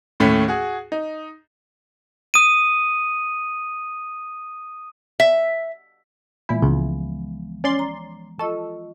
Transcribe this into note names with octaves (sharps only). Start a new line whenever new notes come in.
D#2 A2 A3 C#4
F#4 G#4
D#4
D#6 D#7
E5
A#2 E3 G#3 B3 E4
C#2 F3
C#4 D5 C6
A#5
F4 A4 D#5 C#6